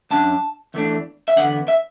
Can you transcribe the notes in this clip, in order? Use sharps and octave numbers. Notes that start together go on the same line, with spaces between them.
F#2 F#3 D4 A5
E2 E3 A3 D4
E5
E2 D3 B3 F#5
E5